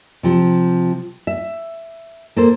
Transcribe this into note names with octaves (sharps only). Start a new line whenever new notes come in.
C3 F3
E5
A#3 A4 C5